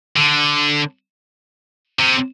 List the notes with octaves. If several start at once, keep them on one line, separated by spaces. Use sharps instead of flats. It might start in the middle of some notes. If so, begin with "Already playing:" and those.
D3
C3